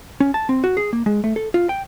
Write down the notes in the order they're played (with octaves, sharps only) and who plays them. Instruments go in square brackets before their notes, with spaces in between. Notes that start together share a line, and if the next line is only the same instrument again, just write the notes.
[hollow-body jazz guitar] C#4
A5
C4
F#4
G#4
A#3
G#3
A3
A4
F4
G5